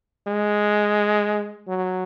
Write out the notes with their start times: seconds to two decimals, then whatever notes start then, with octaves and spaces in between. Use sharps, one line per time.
0.27 G#3
1.68 F#3